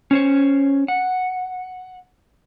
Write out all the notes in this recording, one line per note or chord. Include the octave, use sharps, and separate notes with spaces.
C#4 C5 C#5
F#5